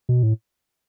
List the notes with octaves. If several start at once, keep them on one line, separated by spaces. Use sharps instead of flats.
B2
A2